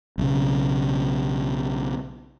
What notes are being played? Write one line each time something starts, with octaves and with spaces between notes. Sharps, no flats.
B1 C#3